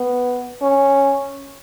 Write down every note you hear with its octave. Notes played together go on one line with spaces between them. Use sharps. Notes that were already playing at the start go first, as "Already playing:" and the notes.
Already playing: B3
C#4